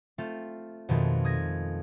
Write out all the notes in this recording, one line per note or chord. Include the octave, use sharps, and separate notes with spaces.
A3 C4 F4
F2 B2 D#3 G#3 A3
D#6 G#6 A#6